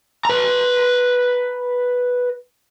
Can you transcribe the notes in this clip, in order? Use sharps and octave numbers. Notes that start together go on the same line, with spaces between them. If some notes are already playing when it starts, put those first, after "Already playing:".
B4 A#5